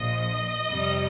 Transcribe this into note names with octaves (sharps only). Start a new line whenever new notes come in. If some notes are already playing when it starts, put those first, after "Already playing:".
Already playing: A#1 A#2 F3 D#5
F2 C3 G3